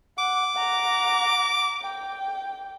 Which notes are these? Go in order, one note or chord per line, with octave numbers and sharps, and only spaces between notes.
F#5 D6
F#5 A#5
G5